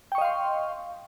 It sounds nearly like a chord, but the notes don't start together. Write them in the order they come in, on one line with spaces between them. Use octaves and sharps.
G5 C#6 D#5 F5 C6